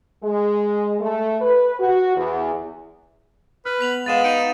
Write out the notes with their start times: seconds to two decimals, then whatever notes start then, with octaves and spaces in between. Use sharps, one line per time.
0.23 G#3
1.01 A3
1.41 B4
1.80 F#4
2.15 E2
3.65 B4 F6
3.81 B3 B6 F7 F#7
4.06 G#3 B4 F5 F#5 A6 D#7 E7
4.24 D#4 D7 D#7 F7